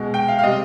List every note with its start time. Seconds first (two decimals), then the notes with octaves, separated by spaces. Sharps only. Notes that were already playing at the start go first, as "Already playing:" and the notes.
Already playing: B2 G#3
0.14 G5
0.28 F5
0.39 F5
0.43 C3 G3 D#5